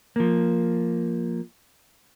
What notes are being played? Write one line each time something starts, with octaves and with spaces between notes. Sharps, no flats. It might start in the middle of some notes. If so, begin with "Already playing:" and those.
F3 A#3